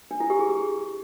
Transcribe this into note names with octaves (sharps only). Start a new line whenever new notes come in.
D4
E4
G4
G#4
G4